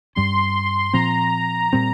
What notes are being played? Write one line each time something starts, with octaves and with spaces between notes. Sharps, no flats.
G2 G3 C#4 C6
A#2 F3 C4 A#5
A#2 G3 C4